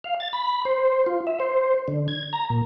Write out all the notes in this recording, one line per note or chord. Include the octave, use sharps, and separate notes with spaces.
F5
A6
B5
C5
F4
E5
C5
D3
G#6
A#5
A#2